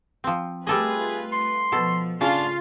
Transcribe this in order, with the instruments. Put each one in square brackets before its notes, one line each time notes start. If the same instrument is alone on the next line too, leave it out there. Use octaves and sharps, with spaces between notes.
[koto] F3 C4
[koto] G3 A4 D#5 [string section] A3 F4 B4 [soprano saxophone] G#4
[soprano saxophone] C6
[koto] B2 A4 [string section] F3
[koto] C#3 [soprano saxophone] D4 [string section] F4 F5 C6